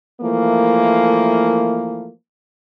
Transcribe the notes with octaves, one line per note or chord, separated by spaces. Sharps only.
E3 F3 A3 A#3